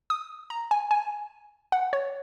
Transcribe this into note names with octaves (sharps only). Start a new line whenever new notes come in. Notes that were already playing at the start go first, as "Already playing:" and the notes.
D#6
A#5
G#5
G#5
F#5
C#5